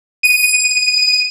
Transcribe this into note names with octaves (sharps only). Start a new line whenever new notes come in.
D#7